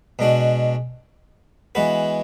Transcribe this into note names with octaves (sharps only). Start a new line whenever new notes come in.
B2 G#3 D4 F#4
E3 G#3 B3 F#4 B4